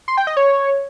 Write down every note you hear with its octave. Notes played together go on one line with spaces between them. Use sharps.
C6
G5
D#5
C#5